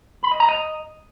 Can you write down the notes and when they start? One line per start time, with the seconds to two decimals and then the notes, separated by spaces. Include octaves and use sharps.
0.23 B5
0.31 D#5
0.40 A#5
0.49 D#5